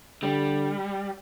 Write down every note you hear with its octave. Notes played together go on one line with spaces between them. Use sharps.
D3 G3